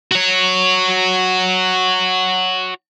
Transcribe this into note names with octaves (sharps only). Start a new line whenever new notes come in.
F#4 C#5